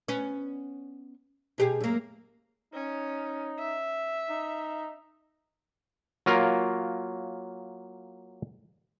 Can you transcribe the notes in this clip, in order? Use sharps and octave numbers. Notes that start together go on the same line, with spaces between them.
B3 C#4
B2 G4 G#4
F#2 A#3
C#4 D#4
E5
D#4
F#3 A#3 F4 A#4